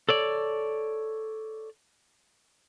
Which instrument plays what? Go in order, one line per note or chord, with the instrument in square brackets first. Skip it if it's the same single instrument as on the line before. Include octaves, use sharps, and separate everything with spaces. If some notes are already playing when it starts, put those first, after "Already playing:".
[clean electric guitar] A4 C#5 D5